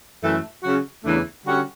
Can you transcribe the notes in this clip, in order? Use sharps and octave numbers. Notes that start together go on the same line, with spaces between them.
F#2 E3 A3
C#3 F#3 C#4 F#4
E2 C#3 E3 A3 D4
D3 G3 C#4 F#4